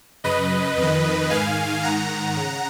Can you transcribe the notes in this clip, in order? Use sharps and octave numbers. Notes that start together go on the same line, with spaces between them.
F#2 C#3 B4 D#5
F2 D#3
G#2 D#3 F5 G#5
G#2 D#3 F#5 A#5
C#3